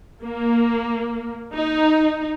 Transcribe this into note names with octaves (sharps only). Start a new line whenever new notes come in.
A#3
D#4